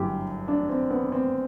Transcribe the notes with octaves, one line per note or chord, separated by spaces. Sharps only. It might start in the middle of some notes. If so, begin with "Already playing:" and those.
Already playing: G1 F#2 E3 G4
D4
C4
B3
C4